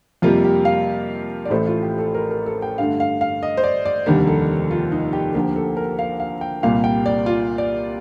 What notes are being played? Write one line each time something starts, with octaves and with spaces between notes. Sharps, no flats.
F2 C3 G3 A#3 F4
G4
F5
D5
A1 A2 A3 C5
F4
G4
A4
A#4
A#4
A4
G5
G2 D3 A3 F5
F5
F5
D#5
C5
D5
D5
F1 D#2 D3 G3 A#3
A4
F4
D#4
G4
D2 D3 F3 A#3 G4
A4
A#4
F5
F5
G5
C2 A#2 G3 A#3 F5
G5
D5
F4
D5